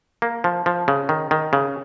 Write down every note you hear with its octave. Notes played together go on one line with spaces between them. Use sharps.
A#3
F3
F3
C#3
D#3
D#3
C#3